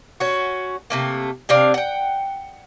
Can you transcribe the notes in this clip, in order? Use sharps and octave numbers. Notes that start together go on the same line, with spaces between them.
C#4 F#4
C3 A3 A#3
C3 C4 D4 F5
F#5 G5